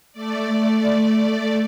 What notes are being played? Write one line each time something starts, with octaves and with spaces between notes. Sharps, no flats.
A3 D5